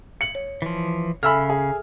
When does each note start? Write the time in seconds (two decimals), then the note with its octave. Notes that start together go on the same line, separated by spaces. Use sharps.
0.21 C#7 F#7
0.35 C#5
0.62 E3 F3
1.23 C#3 A4 E5 G#5 B5 E6 F6
1.50 G#4